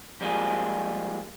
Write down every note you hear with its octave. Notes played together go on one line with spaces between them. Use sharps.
F3 G3 G#3 A#3 F4 G#4